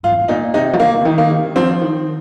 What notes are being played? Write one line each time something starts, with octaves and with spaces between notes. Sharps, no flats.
G#2 F4
F2
G#2
A#2 D#4
C3 D#4
F3
D#3 A#3
C3
D#3
A#3
C3
F3 C4
D#3